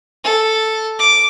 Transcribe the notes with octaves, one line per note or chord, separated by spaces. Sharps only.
A4
D6